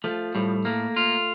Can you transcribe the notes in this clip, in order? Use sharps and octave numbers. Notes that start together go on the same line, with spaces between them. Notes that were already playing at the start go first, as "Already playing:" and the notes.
F3 A3
A2 G3
A3 A#3
F4